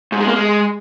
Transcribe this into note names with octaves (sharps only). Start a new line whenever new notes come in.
G#2
G#3
A#3
G#3